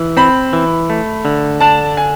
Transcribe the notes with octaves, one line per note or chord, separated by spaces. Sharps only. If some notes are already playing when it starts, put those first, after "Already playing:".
Already playing: E3
C4 B5
E3
A3
D3
D4 A5
G#5